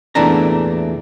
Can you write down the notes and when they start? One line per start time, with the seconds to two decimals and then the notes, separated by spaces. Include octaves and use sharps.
0.15 E2 A#2 E3 A3 D4 A#5